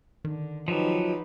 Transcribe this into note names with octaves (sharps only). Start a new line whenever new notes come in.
D3 D#3
F3 F#3 D#4 G4 B4